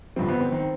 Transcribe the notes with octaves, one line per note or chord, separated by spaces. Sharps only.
G1 G2 F3 C4
B3
C4
D#3